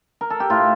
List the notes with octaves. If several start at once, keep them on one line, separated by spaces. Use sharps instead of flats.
A#4
A4
G4
A2 F4